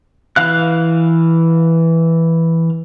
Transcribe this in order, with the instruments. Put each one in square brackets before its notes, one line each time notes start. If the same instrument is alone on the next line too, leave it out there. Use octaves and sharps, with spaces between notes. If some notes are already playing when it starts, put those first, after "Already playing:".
[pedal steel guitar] E3 F5 F#6